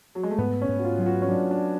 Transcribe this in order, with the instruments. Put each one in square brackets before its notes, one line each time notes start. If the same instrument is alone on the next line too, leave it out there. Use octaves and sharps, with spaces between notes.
[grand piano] F#3
G#3
A3
[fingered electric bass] G#2 [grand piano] B3
[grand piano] C#4
[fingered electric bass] G#2
[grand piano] F#4
F4
[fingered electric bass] F#3 [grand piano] F4
[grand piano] F#4
C#4
[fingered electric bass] F#3 [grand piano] D4
[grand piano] D4